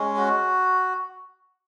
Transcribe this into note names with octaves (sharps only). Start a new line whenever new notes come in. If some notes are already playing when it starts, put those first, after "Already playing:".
Already playing: G#3 C#4
F#4